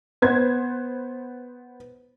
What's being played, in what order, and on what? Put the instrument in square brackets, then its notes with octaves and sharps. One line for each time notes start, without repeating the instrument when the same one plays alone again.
[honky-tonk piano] B3 C5 G#6